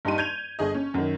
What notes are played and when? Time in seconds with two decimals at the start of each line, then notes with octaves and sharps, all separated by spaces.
0.05 G2 D#4 G4 C6 D#7
0.18 G6 G#6 D#7 F7
0.59 G1 G#4 D#5
0.74 C#4
0.94 F#2 D#3